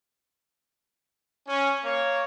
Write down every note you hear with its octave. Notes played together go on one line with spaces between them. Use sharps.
C#4
A#3 C#5